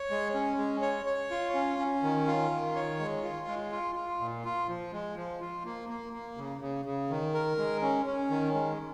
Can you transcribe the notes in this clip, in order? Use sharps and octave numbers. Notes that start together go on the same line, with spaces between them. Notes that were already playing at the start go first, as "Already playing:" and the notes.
Already playing: C#5
G#3
C#4
G#3
C#5
C#5
F4
C#4
C#4
D#3
F4
D#3
C#5
G#3
F4
G#3
F4
F4
A#2
F4
F3
G#3
F3
F4
A#3
A#3
A#3
C#3
C#3
C#3
D#3
A#4
G#3
C#4
C#4
D#3
G#3